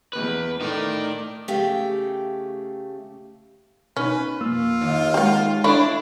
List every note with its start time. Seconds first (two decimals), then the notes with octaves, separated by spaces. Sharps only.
0.13 E2 B4
0.61 A2 D#4 A#4 D5
1.48 C#3 A3 G4 F5 G5
3.97 B2 C#4 D#4 B4
4.40 F2 A#3 F4 E6
4.81 D#2
5.14 G#3 G4 F#5 G5
5.64 A3 D4 E4 C#5 B5